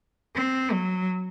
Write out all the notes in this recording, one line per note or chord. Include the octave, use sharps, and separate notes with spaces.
C4
F#3